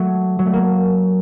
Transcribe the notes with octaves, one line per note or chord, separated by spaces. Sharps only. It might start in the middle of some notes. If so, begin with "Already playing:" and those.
Already playing: F#3 A3
F#3
A3
A#3